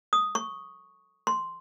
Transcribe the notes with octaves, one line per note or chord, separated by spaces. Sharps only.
D#6
C#6
C6